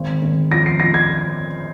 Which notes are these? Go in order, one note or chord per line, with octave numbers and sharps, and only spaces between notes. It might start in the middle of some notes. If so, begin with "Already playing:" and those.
Already playing: G#1
G#1
F3 A#6
C7
F3 A#6
G#6